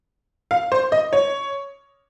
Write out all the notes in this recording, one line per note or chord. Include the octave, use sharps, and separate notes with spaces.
F5
C5
D#5
C#5